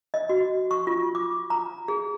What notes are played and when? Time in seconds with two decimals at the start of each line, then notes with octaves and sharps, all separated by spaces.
0.14 D#5
0.29 F#4
0.71 C#6
0.87 F4
1.15 D6
1.50 A#5
1.88 G#4